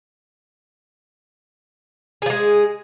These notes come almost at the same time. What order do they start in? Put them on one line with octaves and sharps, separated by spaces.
G#4 F3 G#3